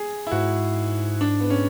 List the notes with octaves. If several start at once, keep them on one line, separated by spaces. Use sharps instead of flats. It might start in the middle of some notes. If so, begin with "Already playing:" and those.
Already playing: G#4
E4
G#2 F#4
D4
B3
C#4